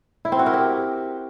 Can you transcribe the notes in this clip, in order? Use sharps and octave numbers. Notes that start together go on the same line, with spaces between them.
E4
C4
F#4
A#4
G4